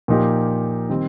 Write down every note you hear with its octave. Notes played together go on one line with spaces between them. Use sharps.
A#2 F3 A#3 D#4 G4
D#3 G3 C4